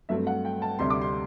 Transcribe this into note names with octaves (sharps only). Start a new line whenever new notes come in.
G2 F#3 A3 C4 E5
F#5
G5
A5
D2 C3 G3 C6
D6
C6